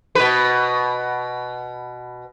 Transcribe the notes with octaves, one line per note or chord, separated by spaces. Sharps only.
B2 B4